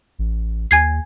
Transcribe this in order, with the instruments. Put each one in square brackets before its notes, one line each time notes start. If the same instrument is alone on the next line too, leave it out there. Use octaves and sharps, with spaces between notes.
[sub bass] A1
[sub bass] D#2 [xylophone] G#5 G#6 C7